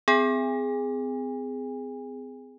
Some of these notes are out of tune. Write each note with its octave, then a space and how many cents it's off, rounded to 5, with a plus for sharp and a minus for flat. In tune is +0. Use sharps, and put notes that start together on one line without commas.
C4 -40 G#4 +0 G#5 -35